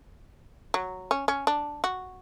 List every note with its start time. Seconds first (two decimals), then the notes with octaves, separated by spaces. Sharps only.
0.74 F#3
1.11 C#4
1.28 C#4
1.47 D4
1.84 F#4